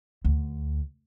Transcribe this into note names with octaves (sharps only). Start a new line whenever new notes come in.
D2